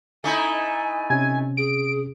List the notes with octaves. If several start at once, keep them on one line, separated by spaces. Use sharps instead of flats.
A3 D#4 E4 G#5
C3 C#4 G#5
G#4 D7